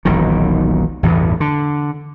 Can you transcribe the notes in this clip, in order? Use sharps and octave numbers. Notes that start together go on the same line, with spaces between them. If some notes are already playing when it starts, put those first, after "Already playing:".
E1 B1 A#2 D#3
A1 E2 G2 B2
D3